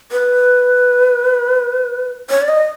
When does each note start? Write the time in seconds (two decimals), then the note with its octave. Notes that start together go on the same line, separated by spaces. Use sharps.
0.12 B4
2.30 C#5
2.42 D5
2.48 D#5